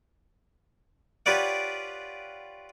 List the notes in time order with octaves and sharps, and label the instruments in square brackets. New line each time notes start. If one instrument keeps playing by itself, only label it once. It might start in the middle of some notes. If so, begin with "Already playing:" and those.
[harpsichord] F4 G4 B4 C#5 D5 F#5